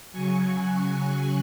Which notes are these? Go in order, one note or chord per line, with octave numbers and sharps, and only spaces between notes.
C#3 F#3 G#5 C#6
C#6 F#6
C#6 F#6